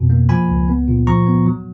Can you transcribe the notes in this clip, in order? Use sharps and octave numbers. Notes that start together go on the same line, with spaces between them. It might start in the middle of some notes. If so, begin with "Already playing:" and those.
Already playing: F2 B2
A#3
F3 G#5 B5
C#2
B3
A#2
F3 A#5 C#6
B3
F#3